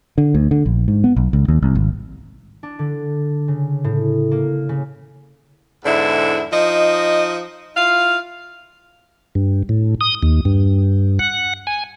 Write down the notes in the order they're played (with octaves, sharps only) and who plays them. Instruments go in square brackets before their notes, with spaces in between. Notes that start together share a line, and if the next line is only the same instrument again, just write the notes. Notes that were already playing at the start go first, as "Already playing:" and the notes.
[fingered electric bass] D3
D2
D3
A#1
G#2
B3
B1
C#2
D#2
C2
G#1
[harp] D4
D3
C#3
A2
A#3
C#3
[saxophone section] E2 G#2 D3 E4
F3 D#4 D#5
E4 F4 F5
[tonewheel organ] G2
A2
D#6
D#2
G2
F#5
G#5